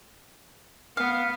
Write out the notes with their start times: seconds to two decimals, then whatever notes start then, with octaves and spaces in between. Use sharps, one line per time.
0.97 B3 F5